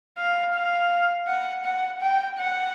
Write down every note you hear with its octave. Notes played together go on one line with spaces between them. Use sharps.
F5
F5
F#5
F#5
G5
F#5